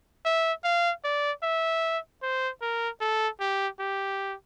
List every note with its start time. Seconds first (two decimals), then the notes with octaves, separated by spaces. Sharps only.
0.25 E5
0.64 F5
1.04 D5
1.43 E5
2.22 C5
2.62 A#4
3.01 A4
3.40 G4
3.79 G4